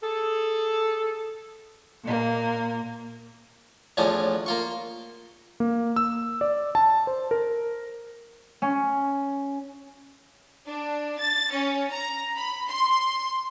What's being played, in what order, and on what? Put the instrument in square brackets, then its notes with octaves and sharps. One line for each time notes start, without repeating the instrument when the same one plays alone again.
[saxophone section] G#4 A4
[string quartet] A#2 A#3
[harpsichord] E2 A2 F3 C#4 D4
A#3 F4 C#6
[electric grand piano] A#3
E6
D5
A5
C5
A#4
[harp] C#4
[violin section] D4
A6
C#4
A#5
B5
C6